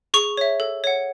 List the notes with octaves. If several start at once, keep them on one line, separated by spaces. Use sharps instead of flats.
G#4 C#6
C#5 E5
A4
C#5 F#5